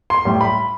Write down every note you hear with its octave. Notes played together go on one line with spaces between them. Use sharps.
C6
A2 G3
B5